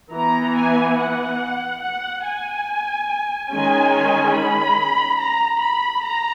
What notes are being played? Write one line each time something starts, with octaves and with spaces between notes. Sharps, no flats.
E3 B3 A#5
G#5
F#5
F#5
G#5
D#3 G#3 C#4 G#5
B5
A#5
B5
A#5